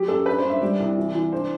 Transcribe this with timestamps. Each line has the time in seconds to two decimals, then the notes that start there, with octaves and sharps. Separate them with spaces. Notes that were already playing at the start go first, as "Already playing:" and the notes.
Already playing: F#3 G4
0.08 F#2 A4
0.26 D4 B4
0.38 C5
0.44 G2
0.50 E5
0.62 G3 D5
0.80 C2
0.98 E3
1.14 E3
1.32 D4 C5